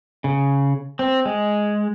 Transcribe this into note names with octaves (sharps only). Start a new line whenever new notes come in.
C#3
C4
G#3